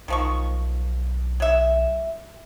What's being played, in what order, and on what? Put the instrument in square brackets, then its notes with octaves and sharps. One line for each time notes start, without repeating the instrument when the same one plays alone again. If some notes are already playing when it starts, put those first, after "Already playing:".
[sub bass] B1 [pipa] D#3 F3 C#6
[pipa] F#3 E5